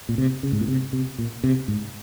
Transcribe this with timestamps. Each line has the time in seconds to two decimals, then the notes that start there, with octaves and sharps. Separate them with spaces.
0.09 A#2
0.18 C3
0.43 C#3
0.52 G#2
0.61 A#2
0.68 C3
0.93 C3
1.19 A#2
1.44 C3
1.68 G#2